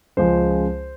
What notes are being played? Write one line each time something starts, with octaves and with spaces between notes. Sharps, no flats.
C#2 C#3 F3 G#3 C5